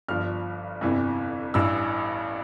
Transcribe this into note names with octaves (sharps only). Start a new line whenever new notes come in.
G1 G2 F3 F6
G1 F2 C3 E3
A1 G2 E3 E6